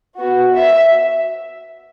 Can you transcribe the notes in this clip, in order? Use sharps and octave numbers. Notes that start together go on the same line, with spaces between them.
B3 F#4
E5